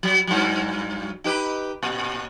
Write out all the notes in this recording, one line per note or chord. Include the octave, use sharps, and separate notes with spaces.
F#3
G2 F#3
D#4 G4 B4
A#2